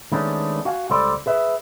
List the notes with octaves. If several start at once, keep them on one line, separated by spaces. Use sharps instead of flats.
D#3 G#3 A3 B3 C#4 D4
F#4 F5 F#5 G#5
C#2 G3 A4 C5 D5 B5
G#4 B4 E5